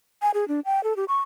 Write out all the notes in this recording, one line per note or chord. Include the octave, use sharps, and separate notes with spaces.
G#5
G#4
D4
G5
A4
G4
C#6